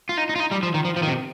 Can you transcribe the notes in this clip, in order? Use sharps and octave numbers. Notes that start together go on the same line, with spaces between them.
F4
D#4
D#4
F4
D#4
G3
F3
D#3
F3
F3
D#3
C3